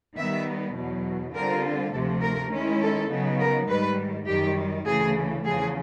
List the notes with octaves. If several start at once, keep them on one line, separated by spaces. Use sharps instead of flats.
D#3 G3 B3 E5
E2 B2 F#3
D3 G3 C4 F4 A#4
D2 C3 F3 A3 A4
A#4
D#3 G#3 C#4 E4
A4
C#3 F#3 B3 D#4
A#4
G#2 D#3 G3 B4
F#2 D#3 G3 G4
D2 C#3 E3 A3 G#4
E2 C#3 F3 G#4